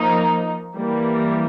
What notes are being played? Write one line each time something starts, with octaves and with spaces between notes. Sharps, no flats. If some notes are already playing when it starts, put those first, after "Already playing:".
Already playing: F3 A#3 D#4
E3 G3 A#3